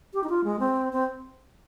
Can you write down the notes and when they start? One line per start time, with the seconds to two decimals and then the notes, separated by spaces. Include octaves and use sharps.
0.14 G4
0.24 D#4
0.29 F4
0.44 G#3
0.59 C4
0.93 C4